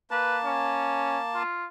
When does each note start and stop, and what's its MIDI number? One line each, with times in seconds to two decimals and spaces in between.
0.11 1.43 58
0.11 0.38 71
0.11 1.43 81
0.45 1.19 61
1.35 1.65 65